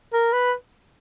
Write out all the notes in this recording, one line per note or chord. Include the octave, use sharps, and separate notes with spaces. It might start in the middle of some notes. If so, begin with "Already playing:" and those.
A#4
B4